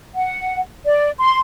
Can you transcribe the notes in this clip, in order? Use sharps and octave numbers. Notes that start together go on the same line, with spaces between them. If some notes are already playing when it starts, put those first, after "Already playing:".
F#5
D5
C6